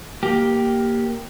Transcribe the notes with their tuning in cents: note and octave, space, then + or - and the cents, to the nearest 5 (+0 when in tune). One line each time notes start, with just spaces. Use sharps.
A#3 +0 G4 +0